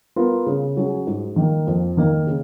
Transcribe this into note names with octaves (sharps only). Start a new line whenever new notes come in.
B3 F4 A#4
C#3
F#3 C#4 G#4
G#2
D#3 A#3
F2
D#3 A#3 D#4 A#4
C#3